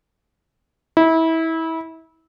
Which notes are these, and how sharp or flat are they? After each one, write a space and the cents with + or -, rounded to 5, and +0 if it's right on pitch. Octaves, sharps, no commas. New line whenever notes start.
E4 -25